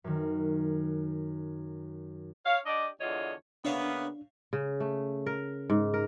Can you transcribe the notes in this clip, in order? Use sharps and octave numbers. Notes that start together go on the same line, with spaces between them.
F#2 D#3
C#5 F5
D4 G4 D5 D#5
E2 D3 F4 C#5 D#5
C#3 A#3 B3 D4 C#5 E5 F5
C#3
A3
A#4
G#2
A#4